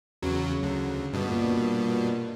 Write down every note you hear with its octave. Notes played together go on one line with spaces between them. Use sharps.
E2 C#3 F#3
D2
G2 B2
A#2